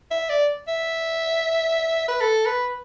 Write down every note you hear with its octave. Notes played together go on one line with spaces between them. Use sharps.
E5
D5
E5
B4
A4
B4